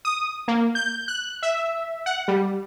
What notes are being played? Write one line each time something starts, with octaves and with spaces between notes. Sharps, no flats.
D#6
A#3
G6
F#6
E5
F#5
G3